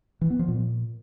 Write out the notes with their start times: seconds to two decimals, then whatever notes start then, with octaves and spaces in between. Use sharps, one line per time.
0.21 E3
0.30 B3
0.39 F3
0.48 A#2